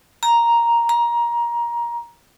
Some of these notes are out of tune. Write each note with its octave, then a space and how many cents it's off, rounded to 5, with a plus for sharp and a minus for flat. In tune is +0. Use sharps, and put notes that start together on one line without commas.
A#5 +5
A#5 +20